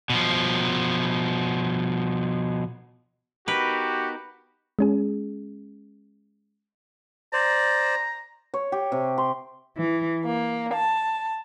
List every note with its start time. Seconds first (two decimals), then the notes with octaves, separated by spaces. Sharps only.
0.10 B2 F3
3.48 B3 D#4 F#4 G4 A#4 B4
4.79 G#3 C#4 G#4
7.33 C5 D5 A#5
8.54 C#5
8.72 G4
8.92 C3
9.18 C6
9.77 E3
10.25 A#3
10.74 A5